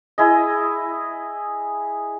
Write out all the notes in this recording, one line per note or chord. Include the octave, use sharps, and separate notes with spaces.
E4 G#4 D#5